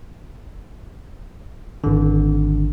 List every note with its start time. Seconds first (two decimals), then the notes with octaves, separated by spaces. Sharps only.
1.84 G#1 D3